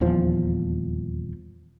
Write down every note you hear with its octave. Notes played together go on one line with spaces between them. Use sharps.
D#1 E2 F3